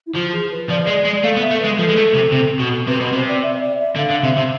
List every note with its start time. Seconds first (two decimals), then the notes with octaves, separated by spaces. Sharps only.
0.07 E4
0.14 F3 F4
0.33 G#4
0.51 B4
0.69 F3 D5
0.87 G#3
0.96 D5
1.05 G#3
1.23 A3 F5
1.37 B3
1.41 E5
1.51 A3
1.60 G#3 B4
1.78 F3 A4
1.89 G#3
1.96 A3
2.14 C3
2.32 C3
2.59 B2
2.88 C3 B4
3.01 B2 B4
3.13 C3 C5
3.28 D5
3.43 E5
3.56 E5
3.61 D5
3.78 E5
3.96 D3 F5
4.11 D3
4.24 C3 E5
4.37 C3